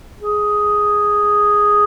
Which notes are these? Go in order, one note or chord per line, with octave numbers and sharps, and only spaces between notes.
G#4